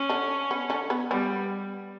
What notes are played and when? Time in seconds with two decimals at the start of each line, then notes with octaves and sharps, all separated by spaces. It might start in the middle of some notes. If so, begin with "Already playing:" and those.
Already playing: C#4
0.10 D3 D4
0.51 B3
0.70 D3 D4
0.90 B3 B4
1.11 G3 B3 B4